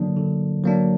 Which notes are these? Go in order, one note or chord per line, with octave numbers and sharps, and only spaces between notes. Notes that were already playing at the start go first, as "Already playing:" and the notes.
Already playing: D3 F#3 A#3 D4
D3
F#3 A#3 D4